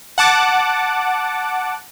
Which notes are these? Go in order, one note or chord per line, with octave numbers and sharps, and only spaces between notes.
F#5 A5 D6